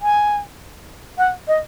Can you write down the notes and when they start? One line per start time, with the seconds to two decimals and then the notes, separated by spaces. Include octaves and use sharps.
0.02 G#5
1.18 F#5
1.48 D#5